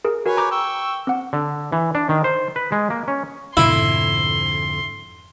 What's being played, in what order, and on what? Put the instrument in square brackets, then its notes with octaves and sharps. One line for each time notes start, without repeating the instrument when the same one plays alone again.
[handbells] G#4 A#4
[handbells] F#4 A#4 [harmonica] B4 C#5 G#5
[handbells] A#5 D6 G6
[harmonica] G5 C#6 E6
[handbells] C4 F#5
[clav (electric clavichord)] D3
E3
D4
D#3
C5
B4
G#3
A#3
C#4
[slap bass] F2 D3 [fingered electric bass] G#2 B2 D4 [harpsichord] E4 [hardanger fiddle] C6